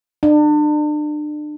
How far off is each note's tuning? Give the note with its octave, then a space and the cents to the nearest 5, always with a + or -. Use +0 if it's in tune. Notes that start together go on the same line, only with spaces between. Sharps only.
D4 +35